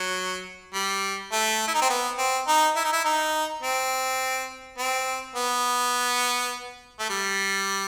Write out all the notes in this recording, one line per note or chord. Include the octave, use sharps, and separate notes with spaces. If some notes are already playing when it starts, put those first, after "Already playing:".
Already playing: F#3
G3
A3
E4
D#4
C4
B3
C4
D#4
E4
D#4
E4
D#4
C4
C4
B3
A3
G3